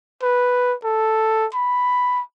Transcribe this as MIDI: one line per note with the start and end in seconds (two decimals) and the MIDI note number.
0.22 0.73 71
0.84 1.46 69
1.54 2.20 83